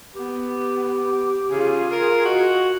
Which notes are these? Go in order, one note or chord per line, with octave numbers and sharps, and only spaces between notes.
B3 G4
C#3 F4 G#4
A#4
F#4 D#5